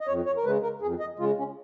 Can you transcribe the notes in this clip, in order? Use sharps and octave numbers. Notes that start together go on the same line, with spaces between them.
D#5
F2 C#5
C#5
A#4
C#3 G#3 B4
A#4
F2 G#4
D#5
C#3 G#3 F4
C#4